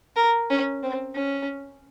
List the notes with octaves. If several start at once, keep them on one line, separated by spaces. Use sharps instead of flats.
A#4
C#4
C4
C#4